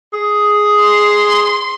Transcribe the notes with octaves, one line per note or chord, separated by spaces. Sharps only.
G#4
C6